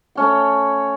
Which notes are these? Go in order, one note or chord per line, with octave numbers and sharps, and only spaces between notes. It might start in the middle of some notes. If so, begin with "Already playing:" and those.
A3 C#4 G5